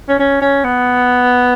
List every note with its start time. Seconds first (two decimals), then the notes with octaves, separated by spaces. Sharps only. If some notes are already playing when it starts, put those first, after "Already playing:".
0.09 C#4
0.19 C#4
0.42 C#4
0.64 B3